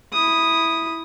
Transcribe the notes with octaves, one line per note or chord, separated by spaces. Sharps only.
E4 D#6